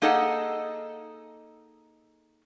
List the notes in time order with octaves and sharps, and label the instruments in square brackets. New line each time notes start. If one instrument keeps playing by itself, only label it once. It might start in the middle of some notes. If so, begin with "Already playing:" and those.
[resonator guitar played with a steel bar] A#3 D#4 G#4 A4 D#5 F#5